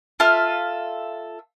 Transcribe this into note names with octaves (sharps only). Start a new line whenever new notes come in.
F4 A4 E5 F6